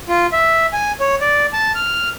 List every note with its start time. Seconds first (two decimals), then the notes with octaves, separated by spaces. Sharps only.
0.08 F4
0.32 E5
0.73 G#5
1.00 C#5
1.21 D5
1.53 A5
1.75 F6